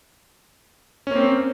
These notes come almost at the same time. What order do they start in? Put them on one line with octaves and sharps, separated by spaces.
C#4 A#3 C4